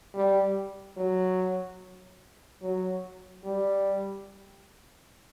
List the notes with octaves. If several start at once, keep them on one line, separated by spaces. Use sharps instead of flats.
G3
F#3
F#3
G3